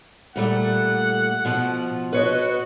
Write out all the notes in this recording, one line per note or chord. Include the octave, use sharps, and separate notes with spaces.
A#2 G3 A3 F#5
B2 F3
F#4 B4 C#5 D#5